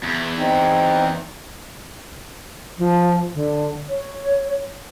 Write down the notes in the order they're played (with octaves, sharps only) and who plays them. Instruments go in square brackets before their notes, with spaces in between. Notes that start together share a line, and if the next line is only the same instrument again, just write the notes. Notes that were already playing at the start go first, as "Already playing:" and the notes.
[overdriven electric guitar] E2
[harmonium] C4 D#4
[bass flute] F3
D3
C#5